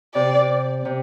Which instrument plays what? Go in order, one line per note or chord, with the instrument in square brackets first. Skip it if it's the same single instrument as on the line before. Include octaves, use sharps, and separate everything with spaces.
[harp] C3 [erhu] D5
[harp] C3